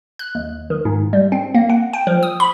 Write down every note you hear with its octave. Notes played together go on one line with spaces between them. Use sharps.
F#6
D#2
D#3
G#2
G3
C4
A#3
F#5
G5
F3
D#6
B5